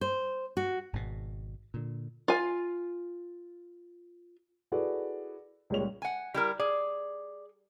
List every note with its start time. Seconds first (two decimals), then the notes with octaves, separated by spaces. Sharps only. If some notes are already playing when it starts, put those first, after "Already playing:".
0.01 C5
0.57 F#4
0.93 G#1 G#2 B2
1.74 A#2 D3
2.28 F4 G#5
4.72 E4 F#4 G#4 A4 B4 D5
5.70 C#2 A#2 G3 G#3 C#5 F7
6.02 F#5 G#5
6.34 G3 E4 A#4
6.60 G#4 D5